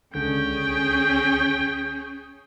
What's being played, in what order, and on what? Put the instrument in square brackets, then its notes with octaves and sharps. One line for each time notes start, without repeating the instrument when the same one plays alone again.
[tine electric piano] C#2 D3 G6 [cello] C#4 G#4 [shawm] G5